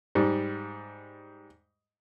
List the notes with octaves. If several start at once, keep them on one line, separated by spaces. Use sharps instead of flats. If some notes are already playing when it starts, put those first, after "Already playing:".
G#2 G3